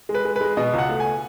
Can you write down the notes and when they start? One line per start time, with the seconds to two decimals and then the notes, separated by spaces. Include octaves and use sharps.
0.09 G#3
0.14 B4
0.25 G#3
0.36 G#3 B4
0.57 B2 D#5
0.73 C#2
0.78 F#5
0.89 A3
1.00 G#5